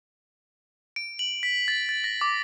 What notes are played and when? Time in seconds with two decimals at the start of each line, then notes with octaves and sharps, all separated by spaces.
0.96 D7
1.19 F#7
1.43 B6
1.68 A6
1.89 A6
2.04 A#6
2.21 D6